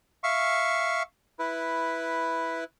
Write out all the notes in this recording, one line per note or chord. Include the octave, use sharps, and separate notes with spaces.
E5 F5 C#6
E4 B4